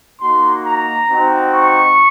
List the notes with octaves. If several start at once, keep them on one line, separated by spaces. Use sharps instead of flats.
A#3 D#4 F#4 C6
A#5
C4 D#4 F#4
C#6